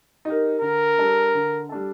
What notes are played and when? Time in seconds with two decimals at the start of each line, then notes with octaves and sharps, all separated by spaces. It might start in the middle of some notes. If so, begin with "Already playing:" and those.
0.25 D#4 G4 A#4
0.61 D3 A#4
0.98 G3 D4 A4
1.34 D3
1.69 G3 D4 A4